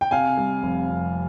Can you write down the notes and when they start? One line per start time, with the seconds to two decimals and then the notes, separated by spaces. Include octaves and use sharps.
0.01 G5
0.11 C3 F5 G#5
0.37 G3
0.63 F1
0.89 F2